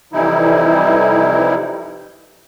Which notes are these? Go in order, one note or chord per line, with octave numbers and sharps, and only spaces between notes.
F2 C3 E3 G3 D#4 E4